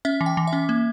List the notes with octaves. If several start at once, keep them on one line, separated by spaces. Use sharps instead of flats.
C#4 E5
E3
G5
E3
E5
C#4
A#3